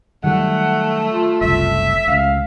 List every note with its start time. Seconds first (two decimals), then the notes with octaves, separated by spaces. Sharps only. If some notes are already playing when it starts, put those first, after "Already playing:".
0.24 D#3 F#3 G3 A3 F#5
1.10 F4
1.41 F#1 C2 E5
2.08 C#2 F5